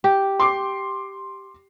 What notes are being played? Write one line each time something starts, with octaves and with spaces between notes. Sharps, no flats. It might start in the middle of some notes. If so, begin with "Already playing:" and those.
G4
C6 D6 C7